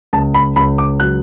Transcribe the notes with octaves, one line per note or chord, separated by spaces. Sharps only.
C#2 A5
B5
C#2 B5
D6
F#3 F#6